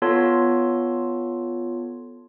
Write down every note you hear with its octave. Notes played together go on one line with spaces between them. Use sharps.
B3 F4 A4 C#5 A5 C6